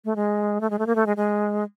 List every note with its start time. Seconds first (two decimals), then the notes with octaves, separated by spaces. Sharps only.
0.05 A3
0.16 G#3
0.61 A3
0.70 G#3
0.79 A3
0.87 A#3
0.96 A3
1.06 G#3
1.17 G#3